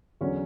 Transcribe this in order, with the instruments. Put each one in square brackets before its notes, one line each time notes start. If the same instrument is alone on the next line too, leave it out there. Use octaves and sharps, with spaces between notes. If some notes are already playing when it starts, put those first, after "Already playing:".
[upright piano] E2 D3 F#3 [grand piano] C#4 C#5